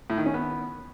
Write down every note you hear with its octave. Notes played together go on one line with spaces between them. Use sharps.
A2
D#3
C#4
B3